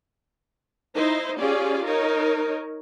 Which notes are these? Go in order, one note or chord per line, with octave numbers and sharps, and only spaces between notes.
D#4 E4 C5
C#4 F4 G4 G#4 D5
D#4 A#4 C#5